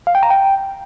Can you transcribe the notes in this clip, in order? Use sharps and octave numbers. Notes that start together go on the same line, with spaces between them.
F5
G5
A#5
G5